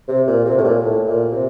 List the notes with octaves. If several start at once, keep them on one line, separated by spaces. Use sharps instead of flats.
C3
A#2
C3
A2
A#2
A2
A#2
C3